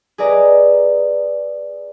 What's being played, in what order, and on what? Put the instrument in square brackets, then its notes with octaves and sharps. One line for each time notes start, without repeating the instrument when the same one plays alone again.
[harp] G#4 B4 D5 D#5 A#5